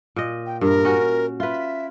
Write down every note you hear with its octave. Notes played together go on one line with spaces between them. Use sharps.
A#2 D#5
G5
G2 A#4
C#4 F#4
F4 B4 E5